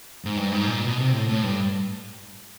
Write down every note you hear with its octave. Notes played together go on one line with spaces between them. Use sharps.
G#2
G2
G#2
A#2
B2
C3
A2
A2
G2